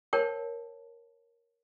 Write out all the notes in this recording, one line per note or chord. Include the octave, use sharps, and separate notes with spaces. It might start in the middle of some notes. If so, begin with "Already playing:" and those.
A#4 C5 C#5 G5 A5